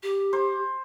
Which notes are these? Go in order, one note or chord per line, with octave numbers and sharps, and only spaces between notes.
G4
C5